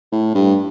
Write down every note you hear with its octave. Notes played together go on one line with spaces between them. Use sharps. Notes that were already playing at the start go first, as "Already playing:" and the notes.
A2
G2